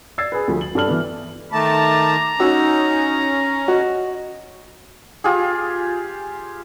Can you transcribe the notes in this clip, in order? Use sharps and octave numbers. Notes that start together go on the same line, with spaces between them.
D5 E6 G#6 A6 C7
G#4 B4
D2 F3
F#7
G2 A4 D5 A5 F6 F#7
E3 B3
D#3 A3 A5 A#5 D6
C#4 D#4 F#4 E6
F#4 D#5
F4 G4 G#4